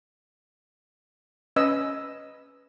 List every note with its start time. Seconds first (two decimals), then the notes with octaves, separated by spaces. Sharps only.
1.56 C#4 B4 D#5 E6